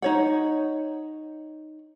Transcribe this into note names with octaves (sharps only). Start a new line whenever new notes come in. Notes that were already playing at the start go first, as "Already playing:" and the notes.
D#4 C#5 F#5